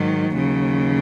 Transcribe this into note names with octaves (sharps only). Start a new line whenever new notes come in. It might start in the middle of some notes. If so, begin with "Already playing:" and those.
Already playing: G#2 D#3 F#3
D#2 C#3 F#3